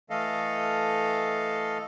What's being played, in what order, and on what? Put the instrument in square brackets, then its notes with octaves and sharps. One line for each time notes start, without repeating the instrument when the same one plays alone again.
[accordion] E3 A3 A4 D#5 F5